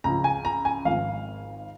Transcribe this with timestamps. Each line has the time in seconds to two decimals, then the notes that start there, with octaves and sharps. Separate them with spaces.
0.04 C#2 C#3 F3 A#5
0.24 G#5
0.45 A#5
0.65 G#5
0.85 G#1 G#2 F3 F5